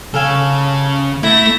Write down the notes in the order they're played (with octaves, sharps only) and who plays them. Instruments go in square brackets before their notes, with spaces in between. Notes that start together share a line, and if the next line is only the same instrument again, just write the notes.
[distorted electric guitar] C#3 [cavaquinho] A4 F5 G#5
[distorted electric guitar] A3 [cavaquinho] E4 [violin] E5 A#6